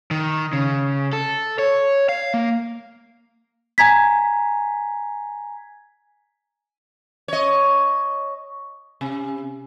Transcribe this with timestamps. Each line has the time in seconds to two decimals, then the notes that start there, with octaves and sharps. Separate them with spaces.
0.11 D#3
0.53 C#3
1.13 A4
1.59 C#5
2.09 F5
2.34 A#3
3.78 G#5 A#5 G#6 B6
7.28 C#5 D#5
9.01 C3